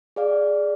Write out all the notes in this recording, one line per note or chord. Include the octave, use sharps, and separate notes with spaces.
G#4 D5 F5